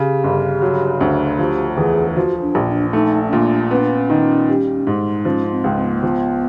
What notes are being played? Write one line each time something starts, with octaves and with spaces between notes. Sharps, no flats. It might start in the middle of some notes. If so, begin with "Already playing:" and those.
Already playing: C#3 G4
G1
F#3
D2
F3 G4
E2 G#4
F3 F#4
D4
A#1
D4
A3 D#4
C#4
A#2 D4
B3 C#4
D4
C#4
D#3
G3
G#2
F3 C#4
C4
C#2
C4
B3
A#3
F3 B3